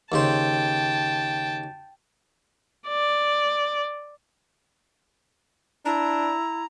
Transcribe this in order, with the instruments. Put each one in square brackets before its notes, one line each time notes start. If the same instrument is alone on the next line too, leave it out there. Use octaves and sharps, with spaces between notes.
[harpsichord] D#2 C#3 C5 [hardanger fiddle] G5 A5
[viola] D5
[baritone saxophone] D4 [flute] E4 [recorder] A#5